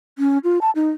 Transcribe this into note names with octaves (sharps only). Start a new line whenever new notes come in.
C#4
F4
A5
D#4